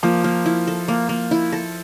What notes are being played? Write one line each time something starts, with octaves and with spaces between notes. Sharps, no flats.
F3 A#3
A#3
E4
A4
A#3
A#3
E4
A4